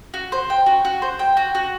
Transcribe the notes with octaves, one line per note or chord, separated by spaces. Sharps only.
F#4
C5
G5
F#4
F#4
C5
G5
F#4
F#4